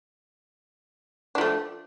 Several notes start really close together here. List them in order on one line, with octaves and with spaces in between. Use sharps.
D4 F3 A3